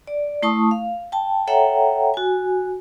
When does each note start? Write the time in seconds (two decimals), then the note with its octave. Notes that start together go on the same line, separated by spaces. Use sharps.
0.07 D5
0.42 A3 E4 A5 C#6 D#6
0.71 F5
1.12 G5 A5
1.47 A4 C#5 E5 F#5 G5 A#5
2.14 F#4 G#5